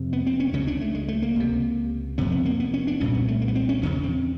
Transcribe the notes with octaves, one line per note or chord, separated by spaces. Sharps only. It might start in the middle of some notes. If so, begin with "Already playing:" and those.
Already playing: F2 C3
B3
C4
C#4
C#2 C#3 C#4
D4
A3
G#3
A3
A#3
C#2 C3
F2 C3 B3
B3
A#3
B3
C#4
D4
C2 A#2 C#4
B3
A3
A#3
B3
C4
C#4
E2 C#3 C#4
C4